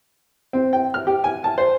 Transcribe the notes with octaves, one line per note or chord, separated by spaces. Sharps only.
C4
G5
F6
G4
G#5
A5
C5